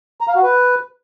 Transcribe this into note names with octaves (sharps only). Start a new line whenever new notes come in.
A#5
F5
F#4
B4